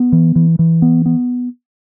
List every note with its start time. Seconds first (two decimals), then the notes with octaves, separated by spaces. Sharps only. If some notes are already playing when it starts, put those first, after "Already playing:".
Already playing: B3
0.12 E3
0.36 E3
0.59 E3
0.82 B3
1.06 B3